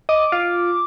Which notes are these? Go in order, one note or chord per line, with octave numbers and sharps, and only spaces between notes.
D#5 D6
F4